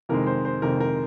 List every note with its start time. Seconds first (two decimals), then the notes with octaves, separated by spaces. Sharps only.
0.09 F2 C3 D#3 G#3 A#4
0.27 C5
0.45 C5
0.62 F2 C3 D#3 G#3 A#4
0.80 A#4